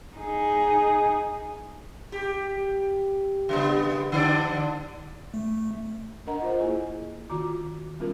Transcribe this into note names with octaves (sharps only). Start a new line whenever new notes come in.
D#4 G#4
G4
C#3 G3 B3
D3 D4 D5
A3
D4 A#4 D#5 F#5 A#5
F4 C5 D#5
A#3 E4 G#4 G#5
D#3 F4 F#4 A#5 D6
G3 B3 C#4 F4 A#4